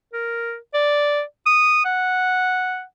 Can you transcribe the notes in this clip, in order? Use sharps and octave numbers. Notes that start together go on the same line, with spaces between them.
A#4
D5
D#6
F#5